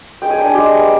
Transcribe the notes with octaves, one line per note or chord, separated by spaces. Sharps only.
G#3 G5
G#5
D4 G5
G#5
G#3 G4 G5
B3